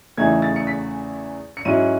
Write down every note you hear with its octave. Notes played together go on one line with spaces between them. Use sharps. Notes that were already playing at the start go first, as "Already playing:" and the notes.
E2 C#3 E3 A3 D#4 G#6
A6
C#7
B6
C#7
G#2 F#3 C#4 E4 D#7